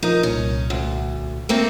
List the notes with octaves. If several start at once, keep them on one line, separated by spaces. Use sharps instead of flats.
F3 D#4 A#4 D#6
C2 A#2 C#4
D2
A3 A#3 C4